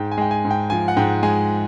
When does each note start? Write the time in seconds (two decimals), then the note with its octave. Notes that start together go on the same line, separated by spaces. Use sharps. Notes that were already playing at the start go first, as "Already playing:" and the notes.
Already playing: G#2 G5
0.11 G#5
0.18 G#3 G5
0.31 G#5
0.45 G#2
0.51 G5
0.70 F3 G#5
0.88 F#5
0.97 G#2 G5
1.23 G#3 G#5